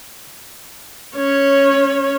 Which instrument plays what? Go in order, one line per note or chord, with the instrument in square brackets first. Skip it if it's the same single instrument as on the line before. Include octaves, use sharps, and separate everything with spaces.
[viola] C#4 C#5